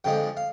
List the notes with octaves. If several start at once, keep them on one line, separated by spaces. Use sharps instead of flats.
F2 D3 F3 G#3 G5
F5